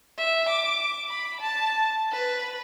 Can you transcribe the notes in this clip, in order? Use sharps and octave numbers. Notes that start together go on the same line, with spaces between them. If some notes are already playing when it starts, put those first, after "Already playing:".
E5
D6
B5
A5
B4